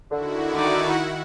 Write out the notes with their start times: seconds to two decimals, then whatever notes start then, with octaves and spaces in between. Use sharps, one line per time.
0.11 D3 D#3 E4 F#4
0.54 D#4 D5
0.93 F#5